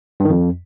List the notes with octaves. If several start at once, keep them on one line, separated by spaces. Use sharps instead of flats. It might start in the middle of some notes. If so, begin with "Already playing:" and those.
G2
D#3
F2